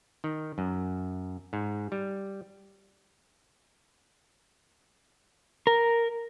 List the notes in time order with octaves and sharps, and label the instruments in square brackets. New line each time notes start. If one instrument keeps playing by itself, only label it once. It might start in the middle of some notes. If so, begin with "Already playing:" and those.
[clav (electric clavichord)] D#3
F#2
G#2
G3
[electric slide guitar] A#4